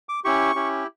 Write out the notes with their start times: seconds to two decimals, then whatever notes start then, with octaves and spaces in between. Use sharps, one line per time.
0.09 D6
0.24 C#4 E4 G4 C#6
0.55 C#4 E4 G4